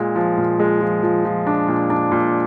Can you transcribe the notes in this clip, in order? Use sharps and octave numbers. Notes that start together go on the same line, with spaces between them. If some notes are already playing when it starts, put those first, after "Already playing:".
Already playing: A#2 G#3
F3
A#2
G#3
F3
F3
F3
D4
A#2
D4
A#2